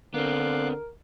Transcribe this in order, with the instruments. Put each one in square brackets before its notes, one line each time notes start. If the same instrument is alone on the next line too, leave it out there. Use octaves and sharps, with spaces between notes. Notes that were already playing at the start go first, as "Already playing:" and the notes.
[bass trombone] D3 [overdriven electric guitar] B3 C4 [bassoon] A#4 [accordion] F5 D6 F#6